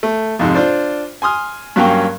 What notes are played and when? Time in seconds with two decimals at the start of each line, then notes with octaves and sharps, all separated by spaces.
0.03 A3
0.39 F2 G#2 C3
0.55 D4 F4 C5 D5
1.22 G#5 C6 D#6 F6
1.76 G2 F#3 A#3 C#4 F5 G5